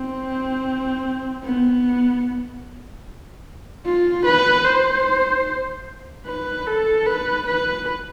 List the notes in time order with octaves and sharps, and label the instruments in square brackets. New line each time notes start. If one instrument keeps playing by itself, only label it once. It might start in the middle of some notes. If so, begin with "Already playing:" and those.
Already playing: [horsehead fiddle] C4
B3
F4
B4
C5
B4
A4
B4
B4